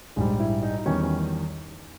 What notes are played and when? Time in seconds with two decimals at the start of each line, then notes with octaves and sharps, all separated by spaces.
0.16 A#1 G#2 G3 G#3
0.40 E4
0.63 D#4
0.78 D#4
0.86 E2 D#3 G3 C#4
1.03 C#4